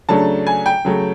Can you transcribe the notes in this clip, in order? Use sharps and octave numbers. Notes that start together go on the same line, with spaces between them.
C#3 F#3 A3 D4 A5
G#5
G5
C#3 F#3 A3